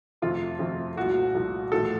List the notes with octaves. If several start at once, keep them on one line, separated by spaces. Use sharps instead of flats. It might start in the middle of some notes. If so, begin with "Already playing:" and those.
F2 C3 F3 A3 F4
F2 C3 F3 A3
C2 A#2 F3 A3 F#4
C2 A#2 F3 A3
A1 A2 F3 A3 A4